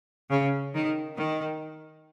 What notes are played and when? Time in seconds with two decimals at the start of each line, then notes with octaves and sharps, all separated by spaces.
0.30 C#3
0.74 D#3
1.17 D#3